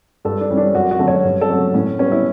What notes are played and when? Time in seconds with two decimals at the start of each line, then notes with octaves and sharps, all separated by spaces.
0.25 G2 A4
0.41 D4
0.50 E3 G3 C#4
0.57 D4
0.75 F#2 F#4
0.91 F#4
0.99 D3 F#3 A3 C#4
1.08 C#5
1.24 G2
1.41 A4
1.49 F#3 A3 C#4
1.74 A2 C#4
1.99 G3 B3 C#4
2.12 E4